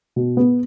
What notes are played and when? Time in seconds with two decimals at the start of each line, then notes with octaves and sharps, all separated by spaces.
0.16 B2
0.37 B3